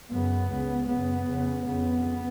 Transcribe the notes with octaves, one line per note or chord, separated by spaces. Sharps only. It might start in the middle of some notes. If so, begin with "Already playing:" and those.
F#2 C#3 B3
C#2 C#3
F#2 C#3 B3
F2 C#3
F2 C#3 B3